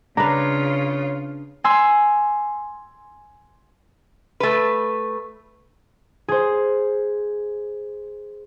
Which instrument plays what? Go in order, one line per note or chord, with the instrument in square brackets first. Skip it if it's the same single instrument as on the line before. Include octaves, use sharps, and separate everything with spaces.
[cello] C#3 F4 [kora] D4 B4 [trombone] C#5 [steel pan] A#5
[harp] G#5 C6 E6
[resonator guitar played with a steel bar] A3 B4
[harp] G#4 C5